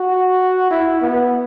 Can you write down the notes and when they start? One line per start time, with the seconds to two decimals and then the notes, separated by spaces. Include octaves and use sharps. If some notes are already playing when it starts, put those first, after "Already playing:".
Already playing: F#4
0.71 E4
1.01 B3